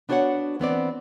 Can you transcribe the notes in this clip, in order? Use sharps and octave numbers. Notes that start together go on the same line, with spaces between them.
B3 D4 F#4 C5 C#5 F#5
E3 B3 C4 D5